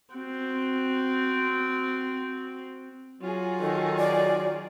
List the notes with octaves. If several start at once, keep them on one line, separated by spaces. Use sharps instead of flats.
C4 F#4
F#3 F4 F#4 G#4
D#3 A4
D5